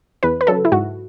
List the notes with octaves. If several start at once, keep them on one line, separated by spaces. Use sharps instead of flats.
E2 B4
B4
C#3 F#3 A4
E4
G#2 F#4